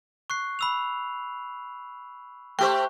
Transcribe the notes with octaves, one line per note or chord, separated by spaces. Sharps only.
C#6 F#6 C7
B5 E6 F7
A3 G4 C5 G5 C#6 F#6